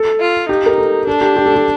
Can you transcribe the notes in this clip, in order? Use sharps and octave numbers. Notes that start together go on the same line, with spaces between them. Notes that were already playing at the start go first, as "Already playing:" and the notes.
Already playing: A4
F4
D#4 G4
A#4
A4
D4 A4
G4
G4
A4
G4